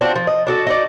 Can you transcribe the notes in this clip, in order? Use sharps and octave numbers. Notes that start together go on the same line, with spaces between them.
C4 D4 F4 F#4
F3
D#5
D4 F#4 A4
D#4 F#4 D5